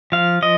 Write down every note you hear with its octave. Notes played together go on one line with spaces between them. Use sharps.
F3 F5
F3 D#5